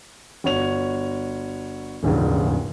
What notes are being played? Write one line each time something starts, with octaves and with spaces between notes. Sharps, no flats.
G1 F#4 C#5 F7
D#1 A#1 E2 G#2 C#3